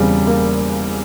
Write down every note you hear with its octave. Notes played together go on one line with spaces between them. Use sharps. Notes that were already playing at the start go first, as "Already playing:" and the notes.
Already playing: E1 E2 C#3 G3 C4
A#3